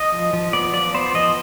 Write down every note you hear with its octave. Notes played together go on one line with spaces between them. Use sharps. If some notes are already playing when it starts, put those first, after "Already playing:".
Already playing: D#5
F3
F3
B3 D5
F3 D5
B3 C5
F3 D#5